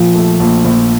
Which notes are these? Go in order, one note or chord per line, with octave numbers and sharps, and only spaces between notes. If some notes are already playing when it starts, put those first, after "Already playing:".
Already playing: A#2 F3
A3
A#1
A#1